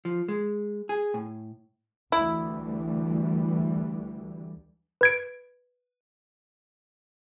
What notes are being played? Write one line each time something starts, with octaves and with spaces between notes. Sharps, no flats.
F3
G#3
G#4
A2
D2 E3 G3 E4
B4 G#6 D7